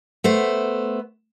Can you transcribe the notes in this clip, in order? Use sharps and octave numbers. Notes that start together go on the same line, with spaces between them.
A3 B3 C5